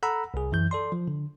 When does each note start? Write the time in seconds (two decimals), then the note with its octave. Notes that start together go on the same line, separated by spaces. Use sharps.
0.03 A4 F#5 A#5 B5 E6
0.34 C2 G#4
0.52 F#2 E3 G6
0.71 A4 D5 C6
0.92 F3
1.08 D3